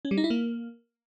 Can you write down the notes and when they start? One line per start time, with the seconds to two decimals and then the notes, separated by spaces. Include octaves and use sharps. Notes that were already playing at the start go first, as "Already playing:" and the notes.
0.05 C#4
0.11 G3
0.17 D#4
0.24 E4
0.30 A#3